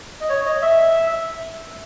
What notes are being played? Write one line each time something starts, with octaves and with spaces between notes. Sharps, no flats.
D#5
C#5
D#5
E5